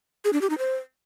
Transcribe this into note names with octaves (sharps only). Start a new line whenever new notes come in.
G#4
D4
G4
D#4
C5